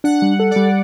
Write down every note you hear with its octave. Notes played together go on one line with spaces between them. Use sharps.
D4 F#5
G3
A4
D5
G3